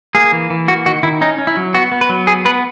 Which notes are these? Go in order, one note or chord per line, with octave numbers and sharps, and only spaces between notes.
A#3 G#4
E3
E3
A#3 F#4
D#3 F#4
D#3 E4
C#4 D#4
C#4
E4
F#3
B3 F#4
B3
B4
F#3
B3 G#4
B3 B4